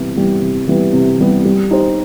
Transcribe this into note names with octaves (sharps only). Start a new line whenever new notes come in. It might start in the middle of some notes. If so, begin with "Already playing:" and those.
Already playing: C3 E3 G3 B3
E3 G3 B3
C3
E3 G3 B3
C3
E3 G3 B3
G3
D#4 G4 C5